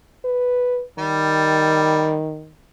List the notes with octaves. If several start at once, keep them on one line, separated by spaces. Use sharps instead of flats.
B4
D#3 G3